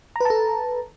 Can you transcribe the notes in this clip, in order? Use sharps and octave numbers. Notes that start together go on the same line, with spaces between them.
A4 B4 A5 A#5